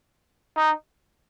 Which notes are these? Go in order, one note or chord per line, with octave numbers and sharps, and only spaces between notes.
D#4